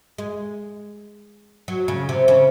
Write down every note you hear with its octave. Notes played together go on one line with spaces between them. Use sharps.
G#3
F#3
C#3
C3
C#3